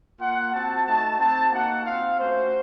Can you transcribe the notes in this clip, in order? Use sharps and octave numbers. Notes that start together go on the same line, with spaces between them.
A#3 F4 F#5
C4 F#4 A5
A3 D#4 F#4 A5
C4 F#4 A5
A#3 D#4 F#4 F#5
C4 F4 F5
A3 C#4 F#4 C5